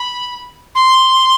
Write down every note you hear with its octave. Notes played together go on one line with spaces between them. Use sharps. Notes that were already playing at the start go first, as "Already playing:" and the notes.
Already playing: B5
C6